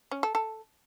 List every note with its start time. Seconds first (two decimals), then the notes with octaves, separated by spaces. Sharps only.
0.11 C#4
0.23 A4
0.35 A4